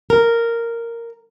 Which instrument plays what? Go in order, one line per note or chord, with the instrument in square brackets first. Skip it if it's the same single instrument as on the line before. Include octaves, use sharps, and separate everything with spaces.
[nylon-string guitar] A#4